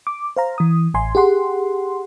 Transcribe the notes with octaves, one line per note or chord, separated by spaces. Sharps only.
D6
C5 F5 A#5
E3 D#6
A1 G#5 C6
G4 G#4 F#5 C6